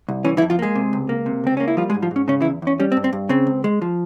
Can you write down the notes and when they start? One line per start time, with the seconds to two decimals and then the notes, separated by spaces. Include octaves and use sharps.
0.08 C2
0.25 E3 C#4
0.37 E3 E4
0.42 F2
0.50 F3 F4
0.59 G#3 A#3 G#4
0.75 C3
0.93 C#2
1.09 A#3
1.26 C3
1.44 C#2 C4
1.57 A#3 C#4
1.68 E4
1.77 F3 G3 F4
1.90 G#3 G#4
1.94 G#2
2.02 F3 F4
2.11 G#2 C#4
2.28 C#3 C#4
2.41 E3 E4
2.45 E2
2.62 E2 C#4
2.80 G3 C#4
2.92 C4
2.97 G2
3.04 C4
3.13 G2
3.29 C#3 C4
3.47 C#2
3.64 G#3
3.82 F3